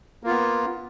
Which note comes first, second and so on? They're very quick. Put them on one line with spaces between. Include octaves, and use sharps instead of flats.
A#3 F4 B3